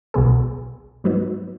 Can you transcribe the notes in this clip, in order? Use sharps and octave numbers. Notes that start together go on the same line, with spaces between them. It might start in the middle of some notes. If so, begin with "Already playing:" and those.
B1 B2 B3 G#4
G#2 F#3 B3 D#4